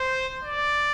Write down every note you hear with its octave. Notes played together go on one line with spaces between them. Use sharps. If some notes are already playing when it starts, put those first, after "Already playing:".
Already playing: C5
D5